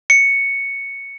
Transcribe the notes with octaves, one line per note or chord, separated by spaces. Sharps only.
C#7